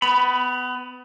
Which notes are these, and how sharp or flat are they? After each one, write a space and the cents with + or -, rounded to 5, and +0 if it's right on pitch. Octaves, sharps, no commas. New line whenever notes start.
B3 +25 B5 +0